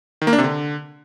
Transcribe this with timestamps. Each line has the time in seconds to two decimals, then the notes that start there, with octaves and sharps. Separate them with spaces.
0.22 D#3
0.27 A#3
0.33 D4
0.38 C3
0.44 D3